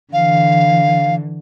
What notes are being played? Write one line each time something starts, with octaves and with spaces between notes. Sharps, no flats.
D3 E3 F5